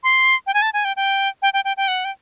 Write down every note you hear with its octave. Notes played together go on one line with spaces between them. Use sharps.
C6
G5
G#5
A5
G#5
G5
G5
G5
G5
G5
G5
F#5
G5